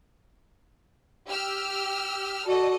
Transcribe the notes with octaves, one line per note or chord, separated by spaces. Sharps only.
G4 E6 F6
F#4 A4 D5 D#5